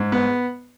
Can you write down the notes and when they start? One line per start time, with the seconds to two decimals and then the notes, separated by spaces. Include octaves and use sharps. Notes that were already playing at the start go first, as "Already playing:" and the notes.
Already playing: G#2
0.12 B3